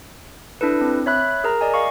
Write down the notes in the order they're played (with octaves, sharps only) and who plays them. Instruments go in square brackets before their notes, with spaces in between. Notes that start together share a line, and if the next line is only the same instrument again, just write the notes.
[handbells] D4 E4 A4 B4
C4
C#5 E5 B5 F#6
G#4 A#4 A#5
D5 D#5 G#5
F5 C#6